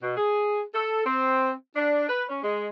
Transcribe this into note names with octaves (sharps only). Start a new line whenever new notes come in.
B2
G#4
A4
C4
D4
B4
C#4
G#3